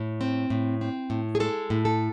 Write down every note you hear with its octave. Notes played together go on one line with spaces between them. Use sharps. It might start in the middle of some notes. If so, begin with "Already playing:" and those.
Already playing: A2
C4
A2
C4
A2
G#4
G#3 A4
A2
A4